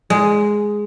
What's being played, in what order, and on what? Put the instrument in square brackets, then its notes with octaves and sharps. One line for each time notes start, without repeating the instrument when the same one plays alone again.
[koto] G#3